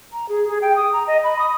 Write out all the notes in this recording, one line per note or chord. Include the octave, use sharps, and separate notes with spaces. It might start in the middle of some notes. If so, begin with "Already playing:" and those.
A#5
G#4
G#4
G5
D#6
A#5
D#5
B5
D#6